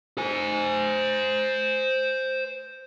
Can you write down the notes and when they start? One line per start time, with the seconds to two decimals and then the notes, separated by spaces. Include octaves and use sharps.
0.18 C5 G#5